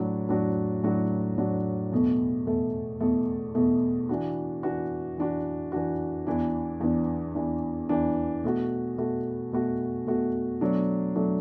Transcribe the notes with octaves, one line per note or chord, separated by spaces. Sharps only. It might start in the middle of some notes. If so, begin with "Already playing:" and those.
Already playing: A2 F#3 D4 F#4
A2 F#3 D4 F#4
A2 F#3 D4 F#4
A2 F#3 D4 F#4
E2 B2 A3
E2 B2 A3
E2 B2 A3
E2 B2 A3
E3 D4 F#4
E3 D4 F#4
E3 D4 F#4
E3 D4 F#4
E2 E3 D4
E2 E3 D4
E2 E3 D4
E2 E3 D4
B2 A3 F#4
B2 A3 F#4
B2 A3 F#4
B2 A3 F#4
B2 F#3 A3 D4
B2 F#3 A3 D4